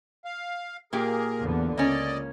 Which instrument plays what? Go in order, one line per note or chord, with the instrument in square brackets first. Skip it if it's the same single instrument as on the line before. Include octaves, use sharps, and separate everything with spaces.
[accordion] F5
[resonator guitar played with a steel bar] A#2 A#3 G4 [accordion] G#4 A#4
[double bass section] E2 D3 B3
[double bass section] C#2 [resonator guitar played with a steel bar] A#3 C#4 [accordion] D5 D#5